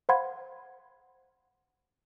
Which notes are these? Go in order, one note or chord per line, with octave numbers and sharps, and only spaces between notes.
C5 F5 F#5 B5 C6 G#6